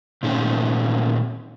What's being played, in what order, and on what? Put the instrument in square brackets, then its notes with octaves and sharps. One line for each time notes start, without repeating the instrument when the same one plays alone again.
[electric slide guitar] A#2 D#3 A3 C4 C#4